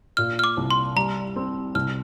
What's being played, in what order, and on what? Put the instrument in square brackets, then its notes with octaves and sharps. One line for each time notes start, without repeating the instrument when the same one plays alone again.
[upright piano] A#2 [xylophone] F6
[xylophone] F6
D6
[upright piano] C2
[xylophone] C6
[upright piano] G3 [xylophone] A#5
[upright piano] C4
[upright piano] C2 [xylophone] F6